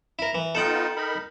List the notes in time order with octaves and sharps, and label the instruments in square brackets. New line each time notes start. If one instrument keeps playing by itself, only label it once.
[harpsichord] E4 A#4
E3
[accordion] B3 D#4 F4 [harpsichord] A4 F#5 G5
[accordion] D#4 A#4 B5